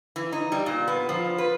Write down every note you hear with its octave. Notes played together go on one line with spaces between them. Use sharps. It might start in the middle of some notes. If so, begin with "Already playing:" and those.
E3
D#4
G3
A#2
B3
F3
B4